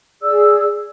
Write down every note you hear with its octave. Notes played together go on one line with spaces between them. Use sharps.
G#4 D5 E6